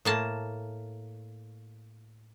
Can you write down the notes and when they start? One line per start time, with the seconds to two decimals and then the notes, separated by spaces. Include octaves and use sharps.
0.05 A2 A#3 A5